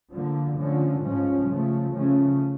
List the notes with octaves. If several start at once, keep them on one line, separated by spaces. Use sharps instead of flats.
D3 F3 A#3
D3 F3 A3 C#4
G#2 F3 G#3 C#4
C#3 F3 A3
C#3 F3 A3 C#4